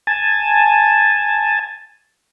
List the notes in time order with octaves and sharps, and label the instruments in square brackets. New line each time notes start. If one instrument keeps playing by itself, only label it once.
[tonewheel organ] G#5 A5